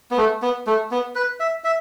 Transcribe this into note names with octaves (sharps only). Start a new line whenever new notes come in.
B3
A3
B3
A3
B3
B4
E5
E5